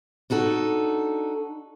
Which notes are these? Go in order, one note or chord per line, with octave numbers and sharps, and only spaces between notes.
D4 D#4 F#4 A4